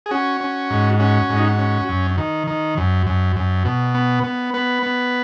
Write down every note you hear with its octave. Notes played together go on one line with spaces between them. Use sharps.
G#4
C#4 F#4
C#4
G#2
C#4 F#4
G#2
D#4
F#4
C#4
F#2
D#3
D#3
F#2
F#2
F#2
B2
B3
B3
B3 B4
B3